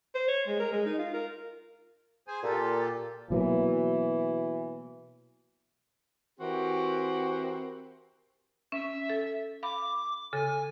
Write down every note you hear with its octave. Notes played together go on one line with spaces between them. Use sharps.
C5
C#5
G#3
A#4
G#3
D#4
F4
A#4
G#4 C5 G#5
A#2 F4 G4 A4
B2 E3 F#3 A#3
E3 C4 F#4 G4 A#4 C5
C#4 E5
A4
F5 B5 D6
C#3 A4 G#5